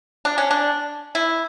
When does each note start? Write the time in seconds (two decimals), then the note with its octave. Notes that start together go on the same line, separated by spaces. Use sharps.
0.25 D4
0.38 C#4
0.51 D4
1.15 E4